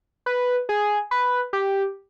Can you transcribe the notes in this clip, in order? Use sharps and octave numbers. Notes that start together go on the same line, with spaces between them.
B4
G#4
B4
G4